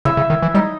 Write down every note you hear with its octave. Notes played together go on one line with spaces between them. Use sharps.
C#3 E4 E5
C#3
D#3
E3
G3 D#4 D#5